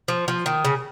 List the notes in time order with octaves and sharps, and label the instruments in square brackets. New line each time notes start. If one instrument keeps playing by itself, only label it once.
[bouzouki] F3
F3
D#3
C#3